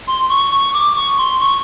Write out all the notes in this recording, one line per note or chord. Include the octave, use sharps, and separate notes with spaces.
C6
C#6
C#6
D6
C#6
C6
C#6